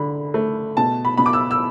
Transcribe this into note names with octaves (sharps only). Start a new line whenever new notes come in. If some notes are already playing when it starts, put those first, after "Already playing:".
Already playing: D3 B5
A3
B2 A5
B5
B2 B5
D6
E6
E6